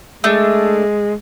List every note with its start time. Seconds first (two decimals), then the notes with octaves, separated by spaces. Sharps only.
0.24 G#3 A3 D4